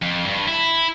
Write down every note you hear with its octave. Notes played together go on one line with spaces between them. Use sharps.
F2
G2
E4